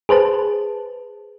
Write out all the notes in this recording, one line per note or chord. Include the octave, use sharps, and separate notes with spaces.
G#4 B4 C5 A5